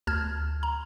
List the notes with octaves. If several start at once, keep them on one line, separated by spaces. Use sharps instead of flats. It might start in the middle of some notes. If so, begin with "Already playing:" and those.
D2 A5 F6 G#6
A#5